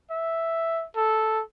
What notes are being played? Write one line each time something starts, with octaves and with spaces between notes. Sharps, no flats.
E5
A4